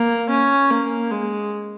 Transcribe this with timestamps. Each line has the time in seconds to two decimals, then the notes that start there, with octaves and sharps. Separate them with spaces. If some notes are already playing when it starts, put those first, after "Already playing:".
Already playing: A#3
0.30 C#4
0.70 A#3
1.11 G#3